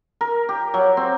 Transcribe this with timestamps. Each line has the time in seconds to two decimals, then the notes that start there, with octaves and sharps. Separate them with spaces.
0.21 A#4
0.49 G4
0.74 F#3
0.97 C4